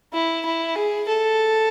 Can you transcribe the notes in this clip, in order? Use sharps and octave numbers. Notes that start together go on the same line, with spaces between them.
E4
E4
G#4
A4